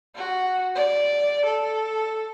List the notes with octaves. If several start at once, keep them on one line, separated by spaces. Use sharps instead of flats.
F#4
D5
A4